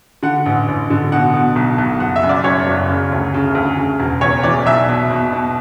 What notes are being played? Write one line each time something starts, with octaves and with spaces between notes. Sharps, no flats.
D3 F#5
A1
A1
D3
B2 F#5
B2
B1
B1
F#1 F#5
E5
F#2
D5
F#2 C#5
F#1
C#3
D2
C#3
D2
C#3
E1
E2 C#5
E3 D5
B1 E5
B2
B2
B2